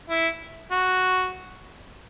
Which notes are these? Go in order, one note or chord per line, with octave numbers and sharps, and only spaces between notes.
E4
F#4